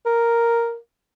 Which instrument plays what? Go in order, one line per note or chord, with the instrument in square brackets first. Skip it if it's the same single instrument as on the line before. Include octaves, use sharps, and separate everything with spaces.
[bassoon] A#4